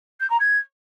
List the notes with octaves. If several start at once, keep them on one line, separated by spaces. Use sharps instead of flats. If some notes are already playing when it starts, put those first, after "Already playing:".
G6
A#5
G#6